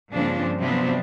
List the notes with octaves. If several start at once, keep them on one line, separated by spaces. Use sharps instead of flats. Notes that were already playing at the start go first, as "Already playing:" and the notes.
G2 A#2 C#3 F3 C4 D4
C3 F3 F#3 B3 C4 D4